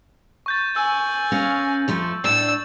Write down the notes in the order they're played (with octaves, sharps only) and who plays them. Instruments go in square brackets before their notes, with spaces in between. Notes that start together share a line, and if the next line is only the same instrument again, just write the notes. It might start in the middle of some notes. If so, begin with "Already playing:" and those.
[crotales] C#6 G6 A6
[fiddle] G#5 [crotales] E6
[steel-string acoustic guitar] C#4 A#4 F5
F2 F3 A3
[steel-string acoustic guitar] A2 D4 [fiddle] E6